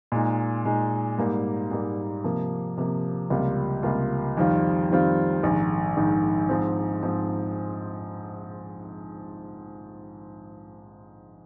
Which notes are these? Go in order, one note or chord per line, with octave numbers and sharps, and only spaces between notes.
A#2 G#3 D#4
A#2 G#3 D#4
G#2 G3 A#3
G#2 G3 A#3
C3 F3 A#3
C3 F3 A#3
C#2 C3 G3 A#3 F4
C#2 C3 G3 A#3 F4
F2 D#3 G3 C4 F4
F2 D#3 G3 C4 F4
A#1 G#2 D#3
A#1 G#2 D#3
G#2 F3 C4
G#2 F3 C4